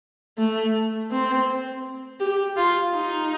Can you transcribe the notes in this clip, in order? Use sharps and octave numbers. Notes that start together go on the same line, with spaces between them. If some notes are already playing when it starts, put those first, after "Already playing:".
A3
C4
G4
F4
D#4